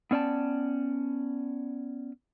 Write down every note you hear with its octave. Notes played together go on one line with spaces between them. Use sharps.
B3 C#4 D5 G5 A5